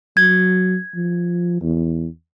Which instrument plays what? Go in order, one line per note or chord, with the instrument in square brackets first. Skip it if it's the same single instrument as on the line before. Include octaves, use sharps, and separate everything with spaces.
[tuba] F#3 [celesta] G#6
[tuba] F3
E2